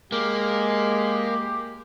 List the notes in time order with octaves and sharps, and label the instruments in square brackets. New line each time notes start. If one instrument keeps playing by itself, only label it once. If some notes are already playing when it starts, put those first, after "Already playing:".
[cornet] G#3 [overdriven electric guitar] A#3 [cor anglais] G4